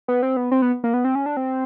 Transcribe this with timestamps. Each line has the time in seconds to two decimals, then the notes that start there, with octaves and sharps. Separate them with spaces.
0.08 B3
0.23 C4
0.37 B3
0.51 C4
0.62 B3
0.84 A#3
0.94 B3
1.05 C4
1.15 C#4
1.26 D4
1.37 C4